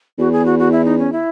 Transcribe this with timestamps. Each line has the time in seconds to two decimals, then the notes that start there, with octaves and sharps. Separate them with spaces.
0.18 E2 F#4
0.33 G#4
0.46 F#4
0.59 F#4
0.72 E4
0.85 D#4
0.99 C#4
1.12 E4